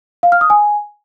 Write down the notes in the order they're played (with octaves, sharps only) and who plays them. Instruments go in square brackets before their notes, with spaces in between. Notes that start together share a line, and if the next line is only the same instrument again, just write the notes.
[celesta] F5
F6
D#6
G#5